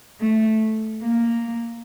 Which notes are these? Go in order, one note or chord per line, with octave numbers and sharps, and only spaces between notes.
A3
A#3